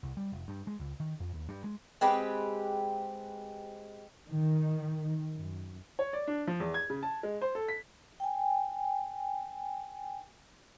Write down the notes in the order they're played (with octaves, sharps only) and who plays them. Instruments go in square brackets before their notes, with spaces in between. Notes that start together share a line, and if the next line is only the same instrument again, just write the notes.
[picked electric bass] C2
G3
F1
G2
G#3
C#2
D#3
F2
D#2
G2
G#3
[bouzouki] G#3 C4 G4 B4
[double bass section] D#3
F#2
[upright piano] C#5
D5
D4
F3
E2
G#6
C#3
A5
G#3
C5
A4
B6
[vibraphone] G5 G#5